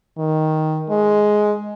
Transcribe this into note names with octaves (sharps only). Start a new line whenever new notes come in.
D#3
G#3